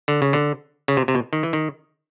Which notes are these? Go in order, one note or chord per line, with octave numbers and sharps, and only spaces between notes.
D3
C#3
D3
C#3
C3
C3
B2
D#3
E3
D#3